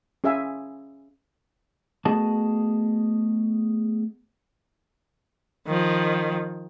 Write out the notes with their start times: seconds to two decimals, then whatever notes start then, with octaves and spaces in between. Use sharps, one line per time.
0.24 C#4 G#4 C#5 E5 F5 G#5
2.05 A3 B3 F#4 G#4 D#5 A5
5.67 D#3 F3